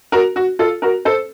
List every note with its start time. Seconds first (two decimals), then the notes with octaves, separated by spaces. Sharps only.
0.12 F#4 A#4
0.36 F#4
0.59 F4 A4
0.82 F#4 A#4
1.05 A4 C5